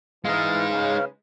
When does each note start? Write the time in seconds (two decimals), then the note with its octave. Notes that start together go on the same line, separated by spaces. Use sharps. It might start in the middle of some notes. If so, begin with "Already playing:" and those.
0.25 E3 G#3 D#4 F5
0.70 C#3 B4